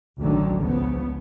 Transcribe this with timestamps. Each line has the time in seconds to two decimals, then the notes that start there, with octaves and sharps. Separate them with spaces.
0.21 A1 D2 D3 D#3 F#3
0.61 C#2 C#3 F3 B3